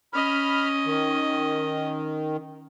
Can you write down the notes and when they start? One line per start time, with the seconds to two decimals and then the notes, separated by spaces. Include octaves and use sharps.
0.13 C#4 D#5 B5 F6
0.86 D#3